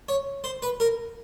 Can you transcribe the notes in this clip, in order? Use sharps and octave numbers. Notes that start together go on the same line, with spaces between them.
C#5
C5
B4
A#4